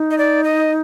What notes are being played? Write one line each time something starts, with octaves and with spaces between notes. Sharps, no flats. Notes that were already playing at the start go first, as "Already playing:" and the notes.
Already playing: D#4
D#5
D5
D#5